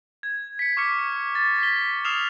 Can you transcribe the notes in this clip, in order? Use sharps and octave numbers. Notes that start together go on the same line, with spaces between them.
G#6
B6 C#7
C#6 D6 F6 C#7
A6
B6 G7
D#6 F6 C7 E7 F7